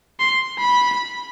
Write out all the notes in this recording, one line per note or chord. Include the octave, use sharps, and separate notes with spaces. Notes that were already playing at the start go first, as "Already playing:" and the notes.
C6
B5